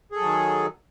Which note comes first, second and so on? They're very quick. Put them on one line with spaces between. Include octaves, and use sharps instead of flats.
G#4 A4 F#3 D#3